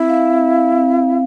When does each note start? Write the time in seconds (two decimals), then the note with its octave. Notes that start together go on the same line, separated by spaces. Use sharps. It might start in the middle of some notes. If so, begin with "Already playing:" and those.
Already playing: C4 E4
0.08 F5
0.29 C4
0.51 F5
0.72 C4
0.94 F5